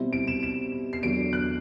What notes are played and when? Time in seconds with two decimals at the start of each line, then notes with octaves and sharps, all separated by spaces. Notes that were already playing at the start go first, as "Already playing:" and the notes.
Already playing: B2 G3 C4 E4
0.13 D7
0.27 E7
0.43 E7
0.93 C7
1.03 E2 D3 F#3 D7
1.33 F#6